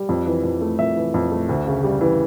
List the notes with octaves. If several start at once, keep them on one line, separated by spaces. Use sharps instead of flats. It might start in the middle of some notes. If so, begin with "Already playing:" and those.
Already playing: G3
F2
E3
F2
A3
F2 E5
E3
F2
A3
D2
C#3
G3
E3